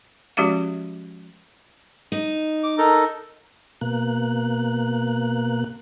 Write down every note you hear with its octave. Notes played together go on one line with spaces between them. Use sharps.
F3 G#3 C#4 F#4 G4 F5
D#4
D6
D#4 A4 A#4
B2 A#3 F#6